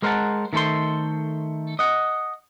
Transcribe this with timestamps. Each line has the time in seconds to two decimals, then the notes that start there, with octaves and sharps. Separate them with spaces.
0.02 G#3 A#4 C5 F5 F#5 A5
0.53 D#3 A3 A4 C5 C6
1.79 D#5 F#5